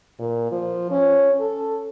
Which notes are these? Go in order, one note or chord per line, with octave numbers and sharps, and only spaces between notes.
A#2
F3
C#4
A4